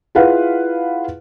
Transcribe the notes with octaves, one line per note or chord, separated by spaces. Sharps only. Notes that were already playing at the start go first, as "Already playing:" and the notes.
E4 F4 G#4 B4 F5 F#5